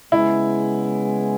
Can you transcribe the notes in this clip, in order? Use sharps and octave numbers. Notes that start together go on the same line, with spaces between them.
C#3 G#3 B3 E4